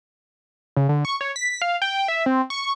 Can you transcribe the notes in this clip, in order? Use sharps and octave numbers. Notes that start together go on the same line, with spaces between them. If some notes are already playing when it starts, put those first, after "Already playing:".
C#3
D3
C#6
C#5
B6
F5
G5
E5
C4
C#6